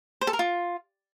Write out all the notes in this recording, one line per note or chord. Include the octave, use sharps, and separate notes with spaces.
C5
A4
A#4
F4